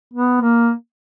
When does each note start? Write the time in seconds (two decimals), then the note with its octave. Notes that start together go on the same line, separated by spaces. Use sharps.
0.14 B3
0.41 A#3